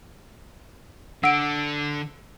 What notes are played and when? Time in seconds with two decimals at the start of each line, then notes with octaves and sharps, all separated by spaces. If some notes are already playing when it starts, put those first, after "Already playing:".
1.24 D3 F#5 E6 D7